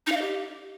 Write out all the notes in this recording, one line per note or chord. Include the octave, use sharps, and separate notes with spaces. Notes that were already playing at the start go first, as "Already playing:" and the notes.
D#4
F5
D#5
G4